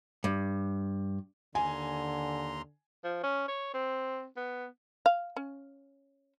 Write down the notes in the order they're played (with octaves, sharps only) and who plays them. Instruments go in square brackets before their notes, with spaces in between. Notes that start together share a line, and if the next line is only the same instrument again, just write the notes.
[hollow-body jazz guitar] G2
[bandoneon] D#2 A#5 C6 [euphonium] D3 [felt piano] G#5
[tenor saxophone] F3
C#4
C#5
C4
B3
[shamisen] F5
C#4